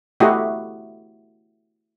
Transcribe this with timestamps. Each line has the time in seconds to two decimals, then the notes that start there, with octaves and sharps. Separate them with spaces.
0.20 A3 E4 F#4 G4 D#5